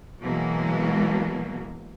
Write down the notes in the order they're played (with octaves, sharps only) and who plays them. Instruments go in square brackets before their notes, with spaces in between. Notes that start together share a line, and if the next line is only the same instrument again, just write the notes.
[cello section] B2 E3 F#3 G#3 A#3